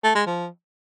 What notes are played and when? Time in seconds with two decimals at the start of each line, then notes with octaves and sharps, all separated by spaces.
0.03 A3
0.15 G#3
0.26 F3